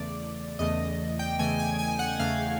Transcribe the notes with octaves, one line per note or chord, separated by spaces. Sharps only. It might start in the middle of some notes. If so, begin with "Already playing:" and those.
Already playing: E2 C#3 E3 A3 D5
E2 C#3 E3 A3 D#5
G5
E2 C#3 E3 A3 G#5
G#5
G#5
F#5
F#5
E2 C#3 E3 A3 F5